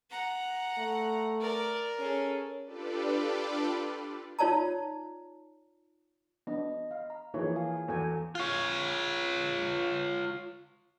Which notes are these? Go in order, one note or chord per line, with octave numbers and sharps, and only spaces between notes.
F#5 A#5
A3
A#4 D5
C#4 G#4 A4
D4 F4 G4 A4 B4 D5
D#4 F4 C#5 D5 A5 A#5
B3 D4 D#5
F5
A#5
E3 F3 A#3 D#4 G#4 C#5
F5 G#5
E2 F#4 A4 G#5
F4 C#5